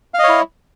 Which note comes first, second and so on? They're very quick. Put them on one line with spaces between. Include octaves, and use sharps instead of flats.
F5 D#5 C#5 E4